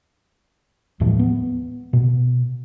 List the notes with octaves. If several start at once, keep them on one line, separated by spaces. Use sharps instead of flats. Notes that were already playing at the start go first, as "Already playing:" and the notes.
D#2 A2 E3 F3
B3
B2